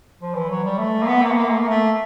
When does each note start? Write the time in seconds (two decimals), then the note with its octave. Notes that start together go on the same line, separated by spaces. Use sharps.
0.21 F3
0.35 E3
0.49 F#3
0.64 G3
0.78 A3
1.03 A#3
1.07 B3
1.22 A#3
1.32 B3
1.36 A#3
1.51 A3
1.59 A#3
1.69 A3